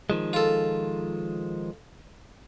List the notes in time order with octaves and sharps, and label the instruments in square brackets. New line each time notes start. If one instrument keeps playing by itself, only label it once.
[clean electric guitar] D#3 F3 G#3
[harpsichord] F4 A4